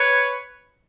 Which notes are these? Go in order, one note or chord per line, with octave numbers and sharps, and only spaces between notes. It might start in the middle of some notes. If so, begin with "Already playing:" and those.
Already playing: B4 C#5